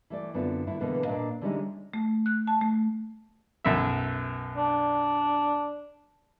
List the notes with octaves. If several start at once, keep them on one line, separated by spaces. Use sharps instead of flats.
E3 A3 D5
F#2 D3 B3 C4 E4 F4
D3 A3 E4
B2 D3 E3 G#3 A#3 B3
A#2 D4 D#5 F5
D3 E3 G3 G#3 C#4 D#4
A3
F#6
A5
A3
B1 F#2 E5
D4